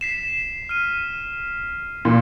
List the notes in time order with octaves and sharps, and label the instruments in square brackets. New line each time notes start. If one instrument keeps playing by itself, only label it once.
[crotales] B6 C7 E7
F6 D#7
[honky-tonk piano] A#2